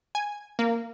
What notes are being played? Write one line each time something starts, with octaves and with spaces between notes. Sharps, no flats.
G#5
A#3